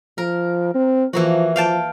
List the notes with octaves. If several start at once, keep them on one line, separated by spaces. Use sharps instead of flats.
F3 A#4
C4
E3 F3 A#3 F#4
F3 F5 G5 A5